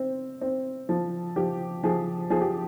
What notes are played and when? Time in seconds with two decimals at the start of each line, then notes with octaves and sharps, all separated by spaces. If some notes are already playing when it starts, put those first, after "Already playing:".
Already playing: C4
0.41 C4
0.89 F3
1.36 F3 G4
1.83 F3 G#4
2.30 F3 G#4
2.41 G4